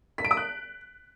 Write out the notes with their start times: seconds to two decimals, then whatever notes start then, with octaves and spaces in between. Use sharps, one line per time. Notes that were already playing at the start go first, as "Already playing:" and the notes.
0.18 B6
0.25 D7
0.31 D#6
0.37 F#6